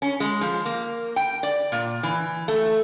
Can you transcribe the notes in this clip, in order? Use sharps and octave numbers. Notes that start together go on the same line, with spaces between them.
C#4
G#3
F3
A#3
G5
D5
A#2
E3
A3